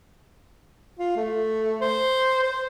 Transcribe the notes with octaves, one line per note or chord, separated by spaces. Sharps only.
F4
A3
C5
C5